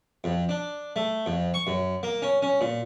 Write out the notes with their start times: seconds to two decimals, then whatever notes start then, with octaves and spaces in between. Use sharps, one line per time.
0.24 F2
0.49 D4
0.96 A3
1.26 F2
1.54 C#6
1.67 F#2
2.03 A#3
2.22 C#4
2.42 C#4
2.61 A#2